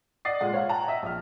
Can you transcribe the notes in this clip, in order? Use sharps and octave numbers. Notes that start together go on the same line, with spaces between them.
D5 D#5 F#5 D#6 A6 C7
A#2 G#3 F#5
C#5 F5 F#5
F#5 G5 A5 A#5
D#5 E5
A#1 F6